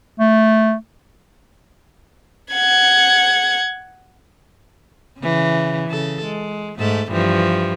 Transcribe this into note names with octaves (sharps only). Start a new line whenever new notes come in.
A3
F#5 G#6
C#3 E3
C#3 A4
G#3
G#2 A3 A4
G2 E3 F3